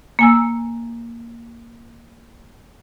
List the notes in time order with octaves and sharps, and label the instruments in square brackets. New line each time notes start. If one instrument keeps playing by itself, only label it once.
[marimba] A#3 G#5 E6